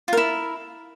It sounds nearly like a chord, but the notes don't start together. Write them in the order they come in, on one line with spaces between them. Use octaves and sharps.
F4 A#4 E4